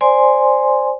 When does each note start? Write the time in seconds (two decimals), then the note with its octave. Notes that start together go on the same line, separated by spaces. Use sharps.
0.01 C5 D5 G#5 C6